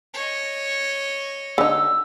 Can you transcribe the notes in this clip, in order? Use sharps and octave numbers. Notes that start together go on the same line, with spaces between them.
C#5 D#5
D3 D#4 E6